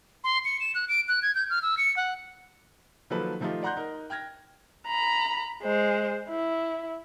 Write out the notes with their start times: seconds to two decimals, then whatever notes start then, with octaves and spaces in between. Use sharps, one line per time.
0.24 C6
0.45 C#7
0.60 E7
0.75 F#6
0.89 D7
1.08 F#6
1.22 G#6
1.35 G6
1.50 F6
1.62 E6
1.78 C#7
1.97 F#5
3.10 D#3 F3 F#3 A#3 A4 B4
3.40 D#3 F3 A3 D#4 F4 G4
3.63 D5 F#5 A#5 C6 F#6 G6
3.77 D#4 A#4
4.10 G5 F6 G#6 A#6
4.87 A#5 B5
5.63 G#3 C5
6.30 E4